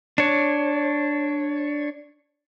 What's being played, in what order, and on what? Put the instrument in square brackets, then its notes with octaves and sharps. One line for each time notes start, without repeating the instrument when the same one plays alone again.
[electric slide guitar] D4 C#5